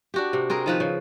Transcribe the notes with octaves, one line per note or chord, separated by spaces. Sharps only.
D4 F#4 G4
C3
C4 G#4 A#4
D#3 F3 B4
C#3